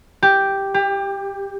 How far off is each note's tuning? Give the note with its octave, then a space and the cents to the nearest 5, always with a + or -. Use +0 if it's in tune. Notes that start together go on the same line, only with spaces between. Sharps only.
G4 +0
G4 +25